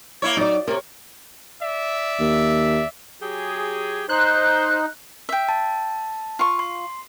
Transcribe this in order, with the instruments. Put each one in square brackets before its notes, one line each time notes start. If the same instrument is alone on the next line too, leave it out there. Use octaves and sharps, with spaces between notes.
[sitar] A#3 E4 C#5
[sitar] F#3 [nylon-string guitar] D#4 D5
[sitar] C3 [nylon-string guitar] A#4 C#5
[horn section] D5 E5
[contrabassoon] D#2
[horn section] F#3 G4 G#4
[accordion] D#4 [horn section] C5 [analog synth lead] F#6
[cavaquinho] E5 G5
[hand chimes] A5
[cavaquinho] F4 C#6
[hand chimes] C6